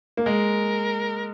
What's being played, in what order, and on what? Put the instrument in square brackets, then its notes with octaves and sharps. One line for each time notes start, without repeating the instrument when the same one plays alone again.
[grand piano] A#3
[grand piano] G#3 [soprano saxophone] A#4